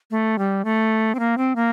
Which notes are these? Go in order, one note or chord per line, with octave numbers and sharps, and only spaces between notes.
A3
G3
A3
C4
A#3
C4
A#3